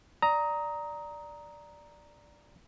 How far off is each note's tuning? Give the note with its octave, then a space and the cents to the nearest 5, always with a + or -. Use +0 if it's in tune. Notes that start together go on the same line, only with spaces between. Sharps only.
D5 +0 A#5 +0 D#6 +20